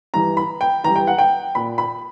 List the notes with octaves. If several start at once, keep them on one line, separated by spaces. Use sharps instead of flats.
G2 E3 A#5
B5
G5
G2 E3 A#5
G5
F#5
G5
A#2 B5
B5